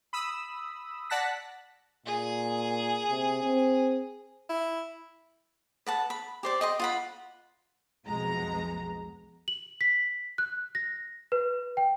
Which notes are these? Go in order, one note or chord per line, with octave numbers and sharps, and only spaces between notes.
B5 D#6 E6
D5 F#5 A5 F#6 A#6 B6
A#2 G#4
C3
C4
E4
B4 F#5 A5
B5
G4 C5 D5
D#5 G5 C6
F4 F#5 B5
B1 F2 B2 G#3 A#5
F#7
B6
F#6
A#6
B4
G5